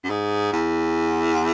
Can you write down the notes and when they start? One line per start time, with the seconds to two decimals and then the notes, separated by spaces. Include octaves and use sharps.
0.04 F#2
0.10 G#2
0.52 E2